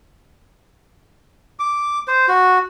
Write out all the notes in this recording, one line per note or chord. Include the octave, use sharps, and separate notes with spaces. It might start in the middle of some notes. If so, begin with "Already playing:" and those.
D6
C5
F#4